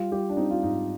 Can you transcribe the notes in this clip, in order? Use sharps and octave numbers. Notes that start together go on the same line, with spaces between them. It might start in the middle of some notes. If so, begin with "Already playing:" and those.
Already playing: G3 F4
G3 G4
D4
C4 D#4
F4
G#2 D#4